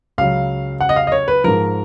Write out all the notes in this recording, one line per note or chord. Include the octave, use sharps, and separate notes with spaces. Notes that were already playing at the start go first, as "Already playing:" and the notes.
C#2 C#3 F#3 F5
F#5
D#5
F5
D#5
C#5
B4
G#2 F3 A#4